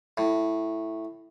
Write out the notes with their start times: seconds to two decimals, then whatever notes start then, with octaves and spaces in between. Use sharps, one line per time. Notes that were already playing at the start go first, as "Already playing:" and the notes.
0.17 A2